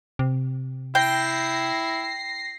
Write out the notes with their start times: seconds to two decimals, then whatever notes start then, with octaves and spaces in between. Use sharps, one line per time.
0.19 C3
0.95 E4 G5 A#6 C7